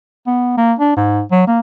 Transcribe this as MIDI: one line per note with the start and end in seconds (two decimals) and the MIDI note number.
0.27 0.57 59
0.57 0.73 58
0.79 0.92 62
0.96 1.22 44
1.31 1.45 54
1.47 1.60 58